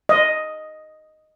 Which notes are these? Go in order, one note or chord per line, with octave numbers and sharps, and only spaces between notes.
D#5